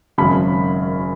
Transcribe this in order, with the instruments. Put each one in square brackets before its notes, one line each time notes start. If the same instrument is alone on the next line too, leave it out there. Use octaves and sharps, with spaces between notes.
[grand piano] G#1 F#2 C#3 B5